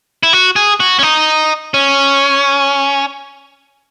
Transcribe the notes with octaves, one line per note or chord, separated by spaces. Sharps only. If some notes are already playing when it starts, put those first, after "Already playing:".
E4
F#4
G#4
F#4
C#4
D#4
C#4